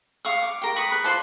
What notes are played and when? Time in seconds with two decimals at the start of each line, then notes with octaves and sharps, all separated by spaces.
0.25 F5 C#6 D#6
0.43 D6
0.62 G4 A#4
0.76 B4 B5 C#6 D#6
0.92 B4
1.04 F4 C5 D5 A5